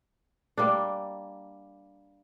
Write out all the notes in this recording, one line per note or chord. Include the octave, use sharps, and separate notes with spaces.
G3 A#3 D4